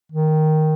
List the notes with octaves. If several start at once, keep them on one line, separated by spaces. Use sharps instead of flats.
D#3